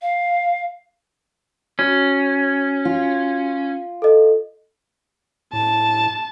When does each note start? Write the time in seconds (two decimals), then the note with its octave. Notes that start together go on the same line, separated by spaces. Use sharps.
0.02 F5
1.79 C#4 F#4
2.85 F4
4.02 A4 D#5
5.53 A2 A5